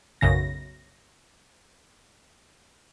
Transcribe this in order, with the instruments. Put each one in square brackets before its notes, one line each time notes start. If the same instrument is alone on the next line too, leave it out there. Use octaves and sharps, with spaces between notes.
[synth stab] B1 F#2 C#3 A#6